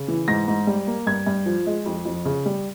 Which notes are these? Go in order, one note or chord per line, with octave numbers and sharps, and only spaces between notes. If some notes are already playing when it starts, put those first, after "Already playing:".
Already playing: C#3
E3
G#2 A#6
G#2
G3
A#3
G2 G#6
G2
F3
G#3
F2
F2
C#3
G3